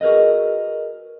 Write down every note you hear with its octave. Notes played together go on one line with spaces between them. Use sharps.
F#4 G#4 A#4 B4 D#5